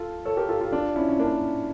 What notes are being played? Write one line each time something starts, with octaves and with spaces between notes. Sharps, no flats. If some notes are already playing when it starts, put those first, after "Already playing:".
Already playing: F4 A4
A4 C#5
G4 A#4
F4 A4
F4 A4
D4 F4
C#4 E4
C#4
A#3 D4